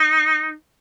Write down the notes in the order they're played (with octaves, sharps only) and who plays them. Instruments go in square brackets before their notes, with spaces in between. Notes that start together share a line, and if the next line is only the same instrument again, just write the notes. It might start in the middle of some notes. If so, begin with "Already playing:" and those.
Already playing: [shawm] D#4